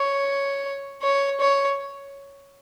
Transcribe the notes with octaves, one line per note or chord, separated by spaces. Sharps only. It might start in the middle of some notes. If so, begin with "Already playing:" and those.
Already playing: C#5
C#5
C#5